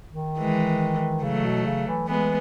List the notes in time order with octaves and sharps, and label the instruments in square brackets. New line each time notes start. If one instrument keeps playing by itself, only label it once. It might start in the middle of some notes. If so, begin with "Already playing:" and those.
[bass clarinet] D#3
[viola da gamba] E3 G#3
[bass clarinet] C#3 [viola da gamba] F#3 A3
[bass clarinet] B2
C#3
E3
[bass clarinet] E3 [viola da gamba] G#3 B3